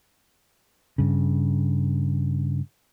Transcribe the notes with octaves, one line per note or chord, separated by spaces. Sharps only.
G2 C#3